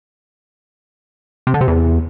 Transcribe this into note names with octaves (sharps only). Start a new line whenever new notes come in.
C3
D3
C3
E2